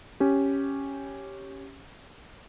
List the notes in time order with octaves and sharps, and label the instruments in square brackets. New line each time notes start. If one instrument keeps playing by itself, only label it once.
[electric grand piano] C#4 G4